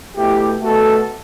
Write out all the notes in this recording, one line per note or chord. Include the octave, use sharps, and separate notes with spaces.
B2 A3 E4 G4
B2 A3 F#4 A4